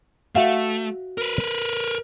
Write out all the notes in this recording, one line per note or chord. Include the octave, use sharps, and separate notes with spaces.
A3 F#4 E5 F5
A#4 B4